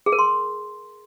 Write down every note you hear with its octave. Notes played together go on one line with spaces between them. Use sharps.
G#4
A#4
C6